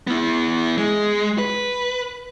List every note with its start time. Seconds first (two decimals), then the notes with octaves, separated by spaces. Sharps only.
0.07 B3 E4
0.78 G#3
1.38 B4